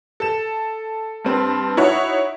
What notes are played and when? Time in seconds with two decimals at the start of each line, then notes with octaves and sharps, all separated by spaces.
0.20 A4 E7
1.25 G2 C4 B4
1.77 D#4 E4 F#4 C#5 F#5